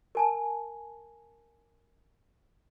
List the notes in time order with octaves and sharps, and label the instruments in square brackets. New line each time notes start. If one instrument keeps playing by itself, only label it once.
[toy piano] A#4 G#5 A5